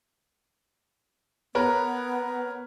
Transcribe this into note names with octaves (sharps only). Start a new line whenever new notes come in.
B3 A#4 B4 C#5